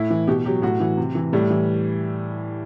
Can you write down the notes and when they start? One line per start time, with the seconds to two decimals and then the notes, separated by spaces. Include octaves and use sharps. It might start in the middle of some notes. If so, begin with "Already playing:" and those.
Already playing: A2 E4
0.10 E3
0.27 B2 G4
0.45 F#3 G4
0.62 A2 F#4
0.80 E3
0.97 C3
1.15 E3
1.33 A2 G3
1.50 E3